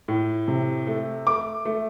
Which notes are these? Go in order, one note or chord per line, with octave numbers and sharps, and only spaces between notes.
A2
C3
A3
A3 D6
A3